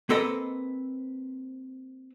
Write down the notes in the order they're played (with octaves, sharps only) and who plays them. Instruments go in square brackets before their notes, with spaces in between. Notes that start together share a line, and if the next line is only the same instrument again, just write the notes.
[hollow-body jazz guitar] A#3 C4 A4 B4 D#5